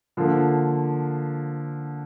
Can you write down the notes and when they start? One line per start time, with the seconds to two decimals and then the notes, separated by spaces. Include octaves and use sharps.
0.17 D3 F3 A#3